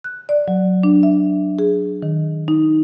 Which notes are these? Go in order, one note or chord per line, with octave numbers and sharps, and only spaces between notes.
F#6
D5
F#3
D4
E5
G#4
D#3
D#4